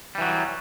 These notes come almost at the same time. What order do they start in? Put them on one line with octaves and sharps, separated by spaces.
G3 E3 F#3